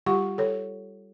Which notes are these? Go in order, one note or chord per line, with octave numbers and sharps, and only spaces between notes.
G3 F4 G4 F#5 C#6
A4 C#5